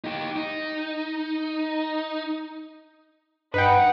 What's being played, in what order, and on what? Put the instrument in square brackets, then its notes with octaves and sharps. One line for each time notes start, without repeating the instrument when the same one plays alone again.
[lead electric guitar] D#4 G4
D#4
[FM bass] G2 [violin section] D#4 F#5 [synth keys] B4 G5